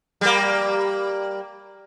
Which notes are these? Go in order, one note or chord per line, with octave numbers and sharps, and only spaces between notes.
G3 A#3